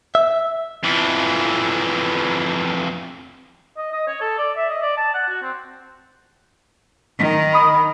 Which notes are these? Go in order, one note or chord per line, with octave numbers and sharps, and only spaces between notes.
E5
F2 E3
D#5
D#5
C#5
A4
D5
E5
D#5
D5
A5
F#5
F#4
C4
D#3
B5 D#6